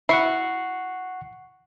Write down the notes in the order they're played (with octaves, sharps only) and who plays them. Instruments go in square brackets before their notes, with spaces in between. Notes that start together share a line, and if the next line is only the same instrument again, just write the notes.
[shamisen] E4 [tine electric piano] F#5 C#6 C7